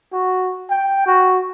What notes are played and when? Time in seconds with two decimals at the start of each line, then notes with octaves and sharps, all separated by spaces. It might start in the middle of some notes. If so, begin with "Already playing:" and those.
0.13 F#4
0.70 G5
1.06 F#4